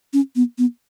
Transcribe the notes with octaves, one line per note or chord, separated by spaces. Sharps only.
C#4
B3
B3